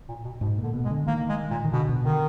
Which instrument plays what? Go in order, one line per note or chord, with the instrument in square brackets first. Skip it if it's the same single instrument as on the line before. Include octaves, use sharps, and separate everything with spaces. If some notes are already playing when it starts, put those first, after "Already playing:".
[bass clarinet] A#2
B2
[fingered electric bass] G#2 [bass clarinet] B2
[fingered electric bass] A#2
[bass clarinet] D3
[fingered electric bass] B2
[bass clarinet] G#3
[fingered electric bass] D3
[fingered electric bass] D#3 [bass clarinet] A#3
[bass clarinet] G#3
A#2
[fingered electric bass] D#3
[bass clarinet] B2 [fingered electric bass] D3
[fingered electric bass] B2
[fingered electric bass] D3 [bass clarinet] D#3